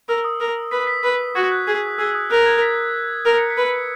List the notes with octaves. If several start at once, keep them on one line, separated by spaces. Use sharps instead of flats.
A#4 E6
D#6
A#4
B4 B6
B6
B4
F#4 G#6
F#6
G#4 G#6
D#6
G#4 E6
D#6
A#4 F#6
G#6
B6
A#4
C#7
B6
B4
C#7